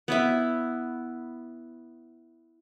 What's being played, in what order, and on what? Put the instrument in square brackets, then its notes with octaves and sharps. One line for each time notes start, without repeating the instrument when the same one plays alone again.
[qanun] B3 E4 E5